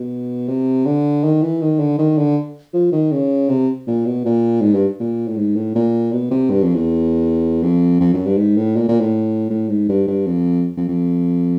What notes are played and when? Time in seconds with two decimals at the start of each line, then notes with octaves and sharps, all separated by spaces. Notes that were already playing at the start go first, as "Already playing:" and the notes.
Already playing: B2
0.49 C3
0.86 D3
1.24 D#3
1.42 E3
1.62 D#3
1.79 D3
1.99 D#3
2.18 D3
2.74 F3
2.92 D#3
3.12 C#3
3.49 C3
3.87 A#2
4.06 B2
4.25 A#2
4.62 G#2
4.74 G2
5.00 A#2
5.28 A2
5.38 G#2
5.56 A2
5.76 A#2
6.13 B2
6.31 C3
6.51 G2
6.63 F2
6.75 E2
7.63 F2
8.01 F2
8.14 F#2
8.26 G2
8.38 G#2
8.57 A2
8.77 A#2
8.89 A#2
9.01 A2
9.51 A2
9.70 G#2
9.89 G2
10.08 G2
10.27 F2
10.77 F2
10.89 F2